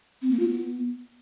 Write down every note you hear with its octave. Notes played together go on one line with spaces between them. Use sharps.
C4
A#3
F4
B3